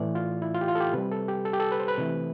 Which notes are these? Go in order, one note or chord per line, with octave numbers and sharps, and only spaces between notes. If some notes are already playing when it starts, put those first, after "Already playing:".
Already playing: A2 E3 A3 D5
F4
E4
F4
G4
F4
A4
G4
C3 G3 B4
A4
G4
A4
G4
A4
B4
C5
B4
C3 E3 A3